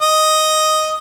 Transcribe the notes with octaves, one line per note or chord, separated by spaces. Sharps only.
D#5